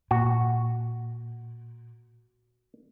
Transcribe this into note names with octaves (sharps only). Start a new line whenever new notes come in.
A#2 F#4